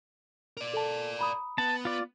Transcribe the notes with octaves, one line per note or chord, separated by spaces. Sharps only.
A#4 D5
A4 A5
A#5 B5 D#6
B3 A5
F4 D5